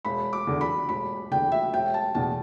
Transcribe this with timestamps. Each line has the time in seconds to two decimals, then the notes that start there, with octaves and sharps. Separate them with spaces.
0.05 E1 B5
0.33 D6
0.47 E2 D3
0.61 B5
0.89 E1 B5
1.31 E2 D3 G5
1.52 E5
1.73 E1 G5
1.94 A5
2.15 E2 B2 A5